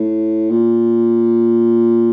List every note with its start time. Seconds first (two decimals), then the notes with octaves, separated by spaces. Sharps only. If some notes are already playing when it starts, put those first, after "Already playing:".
Already playing: A2
0.51 A#2